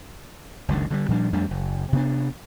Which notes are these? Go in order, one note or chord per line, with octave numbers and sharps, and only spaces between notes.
F#1 C#2 D3 D#3
D3 F#3 G3
A#2 F3 G3 D4
F2 G3 A3 D4
F#1
C3 B3 D4